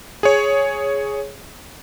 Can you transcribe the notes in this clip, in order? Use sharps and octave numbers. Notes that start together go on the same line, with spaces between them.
G#4 C#5